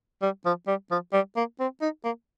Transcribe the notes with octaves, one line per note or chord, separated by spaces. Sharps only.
G3
F3
G3
F3
G3
A#3
C4
D#4
A#3